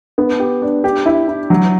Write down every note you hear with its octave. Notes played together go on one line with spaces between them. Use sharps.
B3
G4
D4
G4
E4
E4
F#3